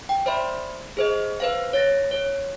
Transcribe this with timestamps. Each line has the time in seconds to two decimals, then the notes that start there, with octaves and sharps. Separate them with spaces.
0.09 G5
0.26 C5 D5 E5 B5 C6
0.97 G#4 C5 D#5
1.40 B4 C5 F5
1.73 C#5 A6 A#6
2.11 C#5